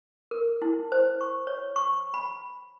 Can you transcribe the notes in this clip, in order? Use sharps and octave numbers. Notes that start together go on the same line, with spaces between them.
A#4
E4
C5
C#6
C#5
C#6
B5